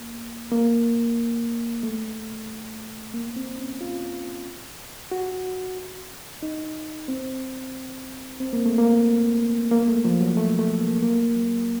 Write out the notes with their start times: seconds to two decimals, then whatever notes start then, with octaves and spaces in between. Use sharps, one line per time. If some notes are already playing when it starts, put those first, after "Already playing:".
Already playing: A#3
0.51 A#3
1.83 A3
3.14 A#3
3.36 C4
3.58 C#4
3.81 F4
5.11 F#4
6.43 D#4
7.08 C4
8.40 C4
8.53 A#3
8.66 A3
8.78 A#3
9.71 A#3
9.83 A#3
9.88 A3
10.05 F3
10.21 F#3
10.37 A3
10.59 A3
10.81 A#3
11.02 A#3
11.35 F#3